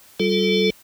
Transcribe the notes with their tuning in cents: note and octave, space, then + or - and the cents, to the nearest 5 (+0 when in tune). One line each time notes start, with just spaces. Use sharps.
G3 -30 F4 +30 A4 -10